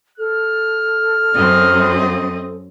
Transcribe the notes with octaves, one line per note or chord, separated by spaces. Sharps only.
A4 F6
F#2 C4 D#5